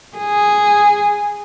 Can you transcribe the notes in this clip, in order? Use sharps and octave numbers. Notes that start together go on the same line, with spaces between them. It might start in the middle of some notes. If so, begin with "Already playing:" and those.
G#4